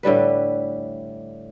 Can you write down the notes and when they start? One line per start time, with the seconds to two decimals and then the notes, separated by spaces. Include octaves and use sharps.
0.03 A2 D3 G3 B4